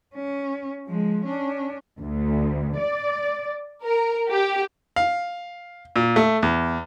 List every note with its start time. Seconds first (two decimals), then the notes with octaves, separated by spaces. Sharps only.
0.15 C#4
0.87 F3 G#3
1.25 C#4 D4
2.00 D2
2.79 D5
3.84 A#4
4.30 G4
4.96 F5
5.96 A#2
6.16 A3
6.43 E2